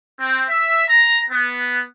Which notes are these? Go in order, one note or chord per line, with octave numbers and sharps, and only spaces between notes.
C4
E5
A#5
B3